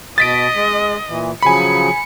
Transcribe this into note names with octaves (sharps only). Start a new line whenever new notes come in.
B2 D#5 A6 B6 D7
G#3
A#2 E3
C#3 F3 F#3 G#5 B5 C#7